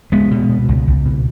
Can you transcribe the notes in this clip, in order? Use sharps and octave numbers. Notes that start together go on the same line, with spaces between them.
C#2 G#3 B3
B2
B2
C#2
C#2
B2